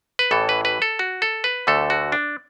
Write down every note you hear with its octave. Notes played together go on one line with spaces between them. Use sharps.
B4
A1 A2 E3 A4
B4
B4
A4
F#4
A4
B4
D2 D3 A3 A4
F#4
D4